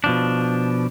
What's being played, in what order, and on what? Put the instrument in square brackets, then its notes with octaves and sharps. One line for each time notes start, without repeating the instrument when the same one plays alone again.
[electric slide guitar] B2 F3 D4